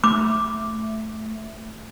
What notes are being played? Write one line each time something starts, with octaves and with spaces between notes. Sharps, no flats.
A3 D6